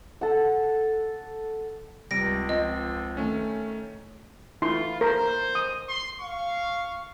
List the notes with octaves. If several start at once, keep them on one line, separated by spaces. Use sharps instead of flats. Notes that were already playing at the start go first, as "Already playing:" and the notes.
A4 F#5
C#2 C3 G3 A#6 D7
F3 C4 D#5
D#3 A3 C#4
E4 F4 C6
A#4 C5
D#6
C6
F5 C#6